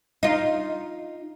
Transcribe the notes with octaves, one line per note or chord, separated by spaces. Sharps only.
D#4 F4